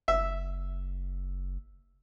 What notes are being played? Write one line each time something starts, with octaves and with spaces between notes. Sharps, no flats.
F#1 E5